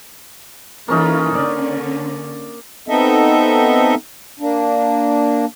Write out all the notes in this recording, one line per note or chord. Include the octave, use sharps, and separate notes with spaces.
E3 A#3 C#4 D#4 F4 A4
D3 C#4 D5
B3 C4 D#4 A4 D#5 E5
A#3 D4